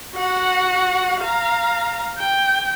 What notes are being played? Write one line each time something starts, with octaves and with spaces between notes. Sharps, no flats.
F#4 F#5
F5 A#5
G5